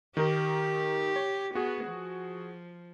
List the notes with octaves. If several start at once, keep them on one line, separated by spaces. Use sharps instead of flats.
D#3 D#4 G4 A#4
C#5
B3 F#4 G#4
F3